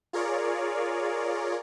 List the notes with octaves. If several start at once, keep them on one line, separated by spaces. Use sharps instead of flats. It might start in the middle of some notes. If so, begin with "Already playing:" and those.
F4 G#4 A#4 C#5 D5